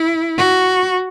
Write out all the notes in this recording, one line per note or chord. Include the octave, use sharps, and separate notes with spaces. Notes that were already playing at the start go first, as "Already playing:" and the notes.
Already playing: E4
F#4